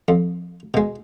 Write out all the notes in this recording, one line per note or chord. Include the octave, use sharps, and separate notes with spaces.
F2
B2 G#3